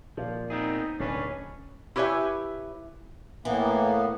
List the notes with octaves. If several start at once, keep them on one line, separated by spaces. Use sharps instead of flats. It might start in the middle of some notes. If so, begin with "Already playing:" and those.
A#2 F3
B3 C4 D#4 G#4
D1 B2 C#4 D4 B4
E4 G4 B4 C#5 E5 G#5
A2 E3 A#3 B3